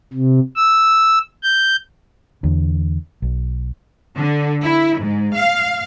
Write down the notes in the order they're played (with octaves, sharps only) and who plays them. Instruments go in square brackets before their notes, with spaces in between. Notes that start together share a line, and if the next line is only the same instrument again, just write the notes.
[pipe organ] C3
E6
G6
[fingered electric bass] E2 D3
B1
[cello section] D3
E4
G#2
F5